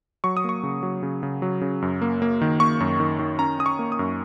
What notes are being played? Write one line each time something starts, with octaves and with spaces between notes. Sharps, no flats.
F#3 C#6
D#6
A#3 C#6
C#3
F#3
C#3
C#3
F#3
C#3
F#2
A#3
A#3
D#3
A#3 C#6
F#2
D#3
D#3
C#4 A#5
C#4 D#6
C#6
A#3
D#6
F#2